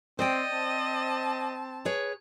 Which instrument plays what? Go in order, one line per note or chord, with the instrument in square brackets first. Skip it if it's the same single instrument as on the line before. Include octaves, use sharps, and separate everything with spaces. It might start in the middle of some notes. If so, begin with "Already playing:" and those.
[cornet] C4 [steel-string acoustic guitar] C5 D5 G5 [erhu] D#5
[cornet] C4 [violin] A5
[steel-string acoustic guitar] G#4 B4 C#5